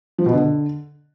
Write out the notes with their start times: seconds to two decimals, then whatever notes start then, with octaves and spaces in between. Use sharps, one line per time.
0.18 F3
0.26 B2
0.33 D3